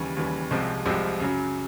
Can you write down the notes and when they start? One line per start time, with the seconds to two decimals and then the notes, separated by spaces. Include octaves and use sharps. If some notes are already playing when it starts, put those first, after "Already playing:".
Already playing: D#2 C#3 E3 G3
0.17 D#2 C#3 E3 G3
0.51 C2 C3 F3 G#3 C4
0.86 C2 C3 F3 G#3 C4
1.20 F#2 C#3 F#3